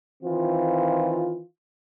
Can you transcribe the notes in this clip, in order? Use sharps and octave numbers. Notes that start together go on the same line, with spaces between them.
D#3 E3 C4 F4